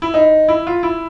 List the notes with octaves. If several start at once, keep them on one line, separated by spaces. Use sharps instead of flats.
E4
D#4
E4
F4
E4